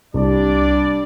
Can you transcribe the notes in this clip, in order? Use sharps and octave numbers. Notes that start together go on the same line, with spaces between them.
C2 G3 D4 D5